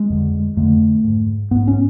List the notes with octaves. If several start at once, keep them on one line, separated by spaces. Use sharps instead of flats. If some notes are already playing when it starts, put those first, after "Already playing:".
Already playing: G#3
F2 D3
F2 D3 A3
G#2
G#2 B3
C#4